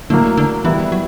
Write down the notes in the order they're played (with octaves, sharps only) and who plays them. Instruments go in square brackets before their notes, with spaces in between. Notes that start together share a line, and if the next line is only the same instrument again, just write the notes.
[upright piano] A2 F#3 A#3 [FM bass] D3
[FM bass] D3
[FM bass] E3 [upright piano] G3 B3 E4
[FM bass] F#3